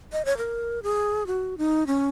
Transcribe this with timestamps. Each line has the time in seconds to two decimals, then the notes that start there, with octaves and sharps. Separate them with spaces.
0.12 D#5
0.25 C#5
0.37 A#4
0.83 G#4
1.27 F#4
1.58 D#4
1.87 C#4